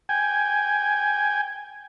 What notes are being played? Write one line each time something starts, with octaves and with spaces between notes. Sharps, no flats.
G5 G#5